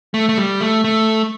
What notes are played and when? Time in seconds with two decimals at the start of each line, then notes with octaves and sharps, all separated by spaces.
0.14 A3
0.29 A3
0.38 G3
0.61 A3
0.84 A3